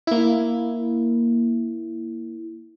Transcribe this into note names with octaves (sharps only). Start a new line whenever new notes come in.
A#3 E4